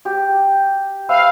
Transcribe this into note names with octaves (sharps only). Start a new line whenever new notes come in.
G4
B4 E5 F5